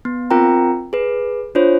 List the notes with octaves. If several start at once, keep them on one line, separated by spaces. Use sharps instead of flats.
B3
C4 F4 A#4 G5 A#5
G#4 B4
D4 F4 C5 C#5